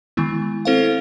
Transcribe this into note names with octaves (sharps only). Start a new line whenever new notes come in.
D#3 G#3 B3 E4
C4 E4 A4 C5 F5